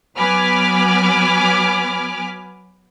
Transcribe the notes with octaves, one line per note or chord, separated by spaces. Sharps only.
F#3 B3 G#5 B5 D6 F6